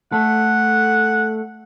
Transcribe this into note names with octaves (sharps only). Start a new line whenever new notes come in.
A3 A4 F#5